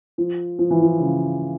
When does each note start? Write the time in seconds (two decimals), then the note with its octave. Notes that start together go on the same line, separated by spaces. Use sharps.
0.18 F3
0.59 F3
0.70 E3
0.82 F3
0.99 C#3